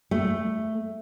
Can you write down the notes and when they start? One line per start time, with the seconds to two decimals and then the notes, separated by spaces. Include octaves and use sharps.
0.11 A3